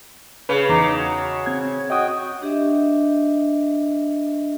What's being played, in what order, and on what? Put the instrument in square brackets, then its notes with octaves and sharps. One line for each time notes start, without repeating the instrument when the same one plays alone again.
[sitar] C#3 [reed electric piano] B4
[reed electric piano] E2 [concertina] D#4 A#5 D6
[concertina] F#4
[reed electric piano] C4 G#6
[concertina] F#4 G5 [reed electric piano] D#5 D#6
[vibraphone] D4 G4 D#5 E5